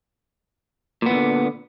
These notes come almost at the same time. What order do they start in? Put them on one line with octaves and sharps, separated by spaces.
A#2 B3 E3 D3